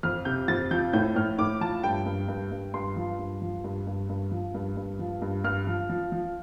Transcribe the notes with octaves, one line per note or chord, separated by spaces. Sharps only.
F2 F6
C3 G6
F2 A6
F3 G6
A2 G6
A2 F6
A2 D6
F3 A5
G2 G5
G2
G2
G2
G2 C6
F3
G2
F3
G2
G2
G2
F3
G2
G2
F3
G2
G2 F6
F3
F3
F3